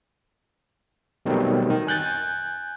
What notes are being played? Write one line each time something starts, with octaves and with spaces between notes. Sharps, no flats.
B2 D#3 F#3 G3 A3 C4
D#3
G#5 F#6 G6 A6